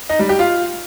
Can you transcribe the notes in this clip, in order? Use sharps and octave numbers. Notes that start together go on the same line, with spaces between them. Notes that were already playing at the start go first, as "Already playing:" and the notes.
D#4
G3
G4
F4